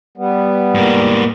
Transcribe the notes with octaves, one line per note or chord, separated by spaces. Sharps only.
G3 B3
G#2 A#3